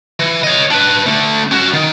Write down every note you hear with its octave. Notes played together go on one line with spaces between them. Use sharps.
E3
C#5 D#5
D4 B4
D3 A3
C#4 F#4
D#3